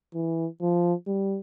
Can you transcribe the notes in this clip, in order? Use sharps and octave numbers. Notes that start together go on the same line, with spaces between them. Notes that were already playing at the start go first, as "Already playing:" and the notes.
E3
F3
G3